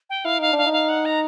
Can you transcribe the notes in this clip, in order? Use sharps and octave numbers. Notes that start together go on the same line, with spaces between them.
G5
E4 F5
D#4 F5
D4
F5
D#4
F5
F#5
A#5